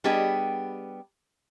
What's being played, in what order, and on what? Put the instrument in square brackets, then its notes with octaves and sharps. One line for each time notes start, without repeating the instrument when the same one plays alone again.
[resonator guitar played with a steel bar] G3 B3 D4 G4 G#4 D#5